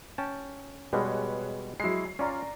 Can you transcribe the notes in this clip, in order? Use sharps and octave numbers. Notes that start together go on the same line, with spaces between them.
C#4 G5 A5
B2 G3 G#3 G#4 B4 C#5
F#3 G#3 E4 C7
C#4 F4 D5 A#5